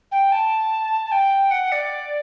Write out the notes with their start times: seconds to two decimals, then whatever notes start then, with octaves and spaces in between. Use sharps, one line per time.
0.11 G5
0.32 A5
1.05 A5
1.11 G5
1.51 F#5
1.72 D5